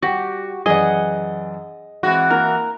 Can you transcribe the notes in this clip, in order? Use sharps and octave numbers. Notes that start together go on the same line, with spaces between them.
G3 F#4 G4 G5
F#2 E3 G#4 D5 D#5 F#5
E3 G#3 C4 F#4
A#3 E4 A#4